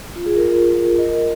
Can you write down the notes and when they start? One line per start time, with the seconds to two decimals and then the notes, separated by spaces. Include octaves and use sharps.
0.16 F4
0.26 G#4
0.37 F4 A#4
0.99 A#4 D#5